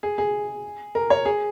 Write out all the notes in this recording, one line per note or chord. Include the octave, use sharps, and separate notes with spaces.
G#4
G#4
A#4
C#5
G#4